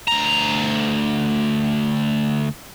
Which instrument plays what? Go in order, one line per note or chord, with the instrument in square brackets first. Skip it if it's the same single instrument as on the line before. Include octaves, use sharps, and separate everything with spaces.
[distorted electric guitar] D2 A#5